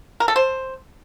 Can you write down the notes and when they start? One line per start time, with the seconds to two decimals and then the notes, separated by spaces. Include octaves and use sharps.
0.20 A#4
0.28 A4
0.36 C5